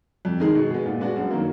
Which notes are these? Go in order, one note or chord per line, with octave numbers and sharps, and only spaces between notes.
F2
D#3 G#3 D#4 G#4
B2
G#3 B3
A#2
G#3 B3 D4 F#4
F#2
D#3 F#3 A#3